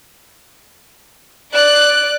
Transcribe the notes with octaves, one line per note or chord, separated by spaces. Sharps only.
D5 F#6